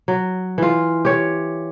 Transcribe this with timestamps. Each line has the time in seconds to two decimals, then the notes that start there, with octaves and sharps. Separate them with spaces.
0.08 F#3
0.58 E3 F4
1.05 G4 C#5